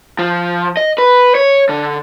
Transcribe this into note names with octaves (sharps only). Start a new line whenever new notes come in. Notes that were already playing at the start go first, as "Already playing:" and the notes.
F3
D#5
B4
C#5
D3